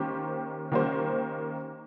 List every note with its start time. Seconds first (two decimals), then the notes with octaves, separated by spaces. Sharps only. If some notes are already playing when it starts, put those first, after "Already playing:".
Already playing: D#3 A#3 C#4 G4 C5
0.72 D#3 A#3 C#4 G4 C5